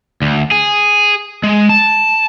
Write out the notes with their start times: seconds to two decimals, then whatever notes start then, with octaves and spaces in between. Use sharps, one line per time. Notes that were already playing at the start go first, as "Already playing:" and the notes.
0.22 D2
0.51 G#4
1.44 G#3
1.69 A5